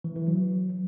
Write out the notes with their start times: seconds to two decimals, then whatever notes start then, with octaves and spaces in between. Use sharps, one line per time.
0.04 E3
0.16 E3
0.28 F#3